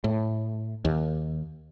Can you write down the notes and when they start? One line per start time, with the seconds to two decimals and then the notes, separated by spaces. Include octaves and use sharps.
0.04 A2
0.85 D#2